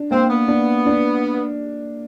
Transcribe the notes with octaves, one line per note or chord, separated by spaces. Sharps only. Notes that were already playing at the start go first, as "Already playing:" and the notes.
Already playing: D4
A#3 C4
B3
D4
D4